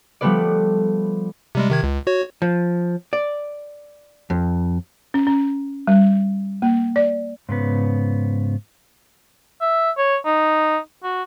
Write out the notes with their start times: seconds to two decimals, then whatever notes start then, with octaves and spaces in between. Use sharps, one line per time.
0.21 F3 G3 A3 B3 B4 D5
1.55 C3 G3 G#3
1.70 C3 D#3 G#6
1.83 C#2
2.07 F#4 C#5
2.42 F3
3.13 D5
4.30 F2
5.14 C#4
5.27 C#4
5.87 G3
6.62 A#3
6.96 D5
7.49 G#2 C#3 B3
9.61 E5
9.97 C#5
10.25 D#4
11.03 F#4